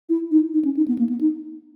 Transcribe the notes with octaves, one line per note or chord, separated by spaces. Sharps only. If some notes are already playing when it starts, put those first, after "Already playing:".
E4
D#4
D#4
C#4
D#4
B3
A#3
B3
D#4